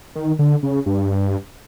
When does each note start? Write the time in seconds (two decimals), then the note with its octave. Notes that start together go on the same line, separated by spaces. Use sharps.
0.15 D#3
0.39 D3
0.63 C#3
0.86 G2